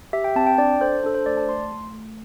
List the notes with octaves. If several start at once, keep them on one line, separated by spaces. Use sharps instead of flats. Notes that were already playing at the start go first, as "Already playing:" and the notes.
G4 E5
G5
C4 A5
G5
D4 D5
A4 C5
D4 A4
C5
A3 D5
A5
A3 C6
A3
A3